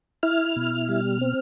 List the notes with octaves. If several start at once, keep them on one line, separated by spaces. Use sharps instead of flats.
E4 F6
B2
G3
C4